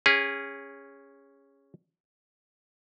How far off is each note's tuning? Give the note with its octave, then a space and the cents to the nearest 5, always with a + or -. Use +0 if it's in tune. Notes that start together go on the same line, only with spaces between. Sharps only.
C#4 +0 G#4 -25